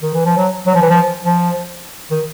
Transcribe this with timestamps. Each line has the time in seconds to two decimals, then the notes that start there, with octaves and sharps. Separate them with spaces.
0.02 D#3
0.14 E3
0.25 F3
0.37 F#3
0.66 F#3
0.75 F3
0.82 E3
0.90 F3
1.25 F3
2.11 D#3